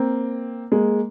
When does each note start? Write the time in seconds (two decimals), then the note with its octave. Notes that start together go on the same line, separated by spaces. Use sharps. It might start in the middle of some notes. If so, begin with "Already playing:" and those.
Already playing: A#3 C4
0.72 G#3 A#3